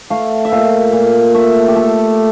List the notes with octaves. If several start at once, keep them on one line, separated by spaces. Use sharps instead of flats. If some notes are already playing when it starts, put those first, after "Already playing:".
A3 F5
E5
A#2 F5
A#2
A3 E5
G4
A3 A4